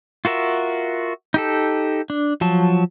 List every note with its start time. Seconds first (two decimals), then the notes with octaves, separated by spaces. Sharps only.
0.25 F4 F#4 A#4 E5
1.34 D#4 G4 A4
2.10 D4
2.41 F3 F#3 A5